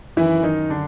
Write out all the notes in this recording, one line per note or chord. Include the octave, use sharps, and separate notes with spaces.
F#2 D#3 E3 E4
D#3 D#4
D3 D4